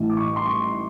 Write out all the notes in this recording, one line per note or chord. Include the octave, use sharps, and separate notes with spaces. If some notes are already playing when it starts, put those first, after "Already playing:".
Already playing: A1 A2 E3
D6
C#6
C6
C#6